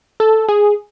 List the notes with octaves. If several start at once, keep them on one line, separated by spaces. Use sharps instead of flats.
A4
G#4